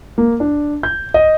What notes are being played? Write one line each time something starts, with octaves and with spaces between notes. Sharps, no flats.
A#3
D4
G6
D#5